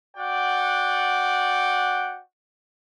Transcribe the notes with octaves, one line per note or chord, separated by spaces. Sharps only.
F#4 D5 F#5 G5